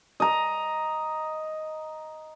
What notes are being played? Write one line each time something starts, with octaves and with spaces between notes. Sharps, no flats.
D#5 A#5